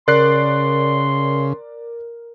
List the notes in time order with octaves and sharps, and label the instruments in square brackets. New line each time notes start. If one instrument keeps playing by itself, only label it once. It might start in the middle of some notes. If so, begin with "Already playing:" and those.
[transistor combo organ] C#3 [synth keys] A#4 [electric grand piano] D5 F#6 C7 [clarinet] C6